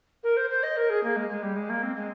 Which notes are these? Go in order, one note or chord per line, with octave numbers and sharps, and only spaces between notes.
A#4
C5
C5
D#5
A#4
G#4
A#3
G#3
G#3
G3
G#3
A#3
C4
G#3